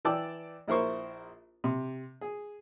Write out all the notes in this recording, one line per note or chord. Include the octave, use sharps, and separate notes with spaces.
E3 D5 G5 A5 D6 E6
A#1 E4 A#4 C5 C#6
C3
G#4